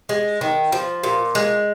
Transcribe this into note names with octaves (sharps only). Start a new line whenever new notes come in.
G#3
D#3
F3
A#2
G#3